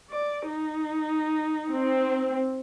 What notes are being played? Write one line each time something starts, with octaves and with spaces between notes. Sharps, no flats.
D5
D#4
C4